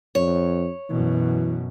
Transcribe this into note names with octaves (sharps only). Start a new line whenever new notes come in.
F2 C#5
F#2 B2 E3